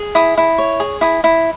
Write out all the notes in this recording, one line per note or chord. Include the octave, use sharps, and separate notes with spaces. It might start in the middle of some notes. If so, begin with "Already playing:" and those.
Already playing: G#4
E4 D#6
E4
C#5
G#4
E4 D#6
E4